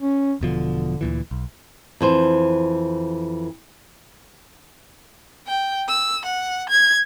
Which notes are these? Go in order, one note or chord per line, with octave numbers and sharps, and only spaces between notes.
C#4
E1 B2 D3 F3
D2 A#2 E3
B1
F2 E3 C5
G5
E6
F#5
G#6